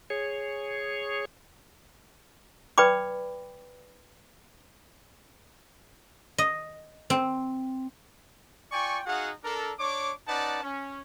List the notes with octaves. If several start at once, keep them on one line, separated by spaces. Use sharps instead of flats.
G#4 C#5
B4 D5 G5 B5 D6
D#5
C4
F4 D5 G5 G#5 C#6
D#4 F#4 G#4 F5 F#5
D4 A4 A#4
D4 C#5 C#6 D6
C#4 D#4 B4 D5 F#5 A5
C#4